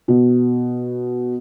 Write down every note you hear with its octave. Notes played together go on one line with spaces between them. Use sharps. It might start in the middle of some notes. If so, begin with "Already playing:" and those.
B2